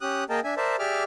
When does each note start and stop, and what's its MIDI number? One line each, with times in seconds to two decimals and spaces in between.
0.01 0.24 61
0.01 0.24 67
0.01 0.24 87
0.01 0.24 90
0.30 0.40 58
0.30 0.40 68
0.30 0.40 70
0.30 0.40 75
0.30 0.40 79
0.30 0.40 81
0.44 0.54 62
0.44 0.54 76
0.44 0.54 80
0.57 0.76 70
0.57 0.76 72
0.57 0.76 74
0.57 0.76 76
0.57 0.76 81
0.79 1.04 67
0.79 1.04 68
0.79 1.04 74
0.79 1.04 76
0.79 1.04 86
0.79 1.04 89